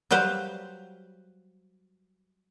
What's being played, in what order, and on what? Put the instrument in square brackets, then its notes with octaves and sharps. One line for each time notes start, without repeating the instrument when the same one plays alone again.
[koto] F#3 G3 B4 C5 F5